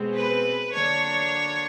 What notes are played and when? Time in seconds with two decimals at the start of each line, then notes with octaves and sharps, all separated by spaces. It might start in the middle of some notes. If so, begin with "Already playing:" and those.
Already playing: B2 G#3 C4
0.15 B4
0.73 D3 F#3 A#3 D4 C#5